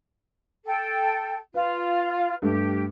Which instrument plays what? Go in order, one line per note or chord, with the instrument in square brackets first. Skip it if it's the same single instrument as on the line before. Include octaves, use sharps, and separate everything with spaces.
[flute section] A4 G5
[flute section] F4 [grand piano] B4
[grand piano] G2 A3 [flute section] G4